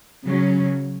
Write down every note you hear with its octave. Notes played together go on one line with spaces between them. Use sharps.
C#3 F#3 C#4